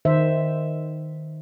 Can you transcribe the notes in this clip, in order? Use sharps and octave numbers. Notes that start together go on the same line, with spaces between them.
D#3 C5 E5